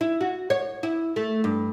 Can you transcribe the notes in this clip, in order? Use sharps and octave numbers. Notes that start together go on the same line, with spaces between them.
E4
F#4
C#5
E4
A3
G2